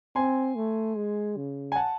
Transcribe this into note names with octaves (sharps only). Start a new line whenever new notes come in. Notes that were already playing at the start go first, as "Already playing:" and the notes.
C4 G#5 C6
A3
G#3
C#3
G#5
F#5 A5